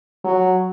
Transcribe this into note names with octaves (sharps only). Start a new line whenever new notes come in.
F#3